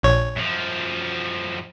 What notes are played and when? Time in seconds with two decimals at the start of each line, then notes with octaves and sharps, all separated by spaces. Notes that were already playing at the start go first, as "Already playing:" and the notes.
0.03 A#1 C#5
0.36 F#2 F3